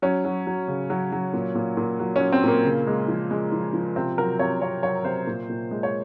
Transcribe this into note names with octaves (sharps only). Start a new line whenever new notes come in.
F#3 C#4
F#3
F#3
C#3
F#3
F#3
A#2
A#2
A#2
F#3
F#3 C#4
C4
A#2 A#3
C#3
G#3
F3
G#3
F3
F3
C3 C4
F#3 A#4
C3 C#5
C3 C#5
F#3 C#5
C3 C5
A#2
A#2
G#3
C#5